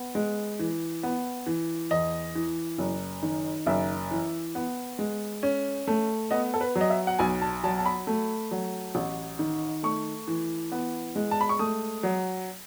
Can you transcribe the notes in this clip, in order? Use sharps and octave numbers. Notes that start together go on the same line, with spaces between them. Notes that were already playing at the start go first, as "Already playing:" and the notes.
Already playing: B3
G#3
E3
B3
E3
E2 D#5
E3
F#1
D#3
F#1 E5
E3
B3
G#3
C#4
A3
B3 D#5
A4
B4
F#3
D#5
E5
F#5
B1 G#5
A5
F#3 A5
A5
B5
A3
F#3
A1
D#3
A3 C#6
E3
B3
G#3
A5
B5
C#6
A3 D#6
F#3